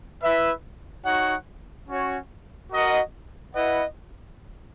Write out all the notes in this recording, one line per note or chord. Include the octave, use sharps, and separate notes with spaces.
E4 B4 E5
D#4 F#4 C#5 F#5
C#4 F#4 C#5
F#4 A#4 D#5 F#5
E4 B4 D#5 F#5